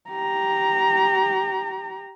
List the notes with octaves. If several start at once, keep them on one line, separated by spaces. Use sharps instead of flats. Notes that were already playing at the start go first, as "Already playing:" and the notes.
G4 A#5